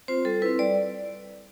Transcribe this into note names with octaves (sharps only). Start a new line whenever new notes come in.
C4 F4 C5
G3 A4
C4 E4 B4
G3 D5